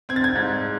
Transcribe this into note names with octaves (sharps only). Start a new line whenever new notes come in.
C4 G#6
A6
G#6
G#2